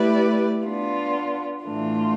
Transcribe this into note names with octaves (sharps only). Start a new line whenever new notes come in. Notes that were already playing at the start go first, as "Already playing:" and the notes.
Already playing: A3 E4 G4 B4 D5
B3 D4 F4
A2 E3 A3 D4 F4